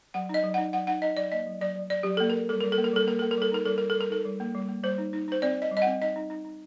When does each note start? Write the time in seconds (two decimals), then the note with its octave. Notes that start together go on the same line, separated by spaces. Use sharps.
0.14 F#3 F#5
0.29 D#4 D#5
0.44 F#3
0.54 D#4 F#5
0.73 F#3 F#5
0.87 D#4 F#5
1.02 D#4 D#5
1.17 F#3 D5
1.32 A#3 D#5
1.47 F#3
1.61 F#3 D5
1.76 F#3
1.90 F#3 D5
2.03 F#3 G4
2.17 A#3 A4
2.30 A#3 A#4
2.49 G3 A4
2.60 G3 A#4
2.72 A4
2.78 A#3
2.84 A#4
2.93 G3 A4
3.07 A#3 A#4
3.19 A#3 A4
3.31 A#4
3.37 G3 A4
3.52 D#4 A#4
3.65 G3 A4
3.78 G3 A#4
3.90 A4
3.96 G3 A#4
4.10 D#4 A4
4.25 G3
4.40 A#3
4.55 G3
4.69 A#3
4.84 G3 C5
4.98 D#4
5.13 D#4
5.28 D#4 C5
5.42 C4 D5
5.57 C4 D#5
5.71 G3
5.77 D#5
5.82 F#5
5.87 C4
6.01 D#4 D#5
6.16 D#4
6.30 D#4
6.45 D#4